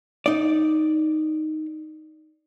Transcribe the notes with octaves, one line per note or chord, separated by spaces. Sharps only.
D#4 D5